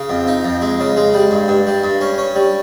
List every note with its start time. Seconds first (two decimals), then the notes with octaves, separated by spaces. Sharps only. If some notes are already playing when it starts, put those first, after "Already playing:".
Already playing: C#3
0.09 F2
0.27 D#4
0.45 F2
0.62 G#3
0.80 C#3
0.96 G#3
1.14 G3
1.31 G2
1.48 G2
1.67 G3
1.84 G2
2.01 C#4
2.18 C#4
2.35 G3